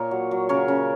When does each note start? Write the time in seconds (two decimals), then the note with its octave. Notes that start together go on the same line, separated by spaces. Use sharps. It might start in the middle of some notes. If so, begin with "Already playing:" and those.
Already playing: A#2 A#4 C#5
0.11 F#3
0.31 F#3
0.49 C#3 A#4 C#5
0.68 C#3